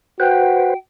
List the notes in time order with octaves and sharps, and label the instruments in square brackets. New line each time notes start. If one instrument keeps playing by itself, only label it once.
[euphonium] F#4 [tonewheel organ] B4 C5 [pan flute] G5